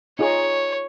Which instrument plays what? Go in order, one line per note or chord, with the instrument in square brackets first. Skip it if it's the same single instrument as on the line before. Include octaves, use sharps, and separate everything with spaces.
[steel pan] D#4 F4 G#4 [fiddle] C#5